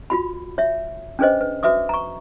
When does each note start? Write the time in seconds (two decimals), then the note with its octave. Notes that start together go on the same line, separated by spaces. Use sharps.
0.10 F4 F#4 B5
0.58 C#5 E5
1.19 C#4 D4 G#4 B4 C5 D#5
1.41 B4
1.63 F#4 B4 E5 D6 D#6
1.89 A#5 C#6